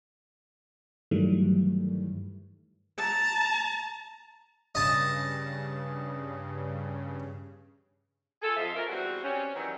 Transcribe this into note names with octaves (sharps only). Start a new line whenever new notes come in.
G2 D#3 E3 F#3 G3 A3
A5 A#5
G2 C#3 D#5 A5
F4 G#4 A4
F2 F3 F4 D#5 E5
C#4 F4 A#4
E2 G3 C4 F#4
G3 C4 C#4
D#3 E3 F#3 G3 C#4